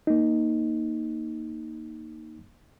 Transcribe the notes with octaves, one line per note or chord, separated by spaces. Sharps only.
A#3 D#4